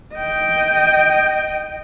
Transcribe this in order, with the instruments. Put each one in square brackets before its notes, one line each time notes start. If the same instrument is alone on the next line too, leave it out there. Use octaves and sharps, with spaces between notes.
[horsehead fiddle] D#5 G5